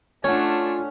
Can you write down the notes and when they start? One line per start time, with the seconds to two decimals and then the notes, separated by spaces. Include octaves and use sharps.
0.24 A3 C#4 D4 F4 C#5 F#5